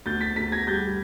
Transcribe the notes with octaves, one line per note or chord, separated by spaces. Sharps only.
D2 G6 A6
A6 B6
D2 A6 B6
G#6 A#6
G3 G6 A6